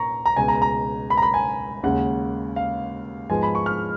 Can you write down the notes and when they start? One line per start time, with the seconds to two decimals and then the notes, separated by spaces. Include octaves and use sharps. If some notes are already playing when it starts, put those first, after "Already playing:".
Already playing: A#2 A#5 C#6
0.26 A#5
0.37 C#2 B2 G#3 G#5
0.48 A#5
0.62 A#5
1.10 B5
1.17 A#5
1.22 B5
1.34 G#5
1.83 D#2 C#3 G#3 F#5
2.56 F5
3.29 G#2 F3 G#3 B3 G#5
3.43 B5
3.55 C#6
3.66 F6